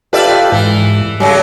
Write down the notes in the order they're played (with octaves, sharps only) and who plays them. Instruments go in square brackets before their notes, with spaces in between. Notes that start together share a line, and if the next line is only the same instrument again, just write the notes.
[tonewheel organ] F4 G4 A4 [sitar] B4 D5 E5
[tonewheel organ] G#2 [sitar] E3
[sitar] C#3 F#3 A3 [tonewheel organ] G3